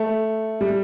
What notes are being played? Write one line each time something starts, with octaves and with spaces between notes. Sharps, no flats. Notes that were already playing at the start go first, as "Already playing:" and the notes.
Already playing: A3
G3